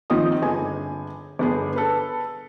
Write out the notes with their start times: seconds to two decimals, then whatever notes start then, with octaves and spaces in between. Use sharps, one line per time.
0.10 D#3 F3 A#3 C4 D#5 D#6
0.42 G1 G#4 G#5
1.39 G1 B3 G#4
1.76 A4 B4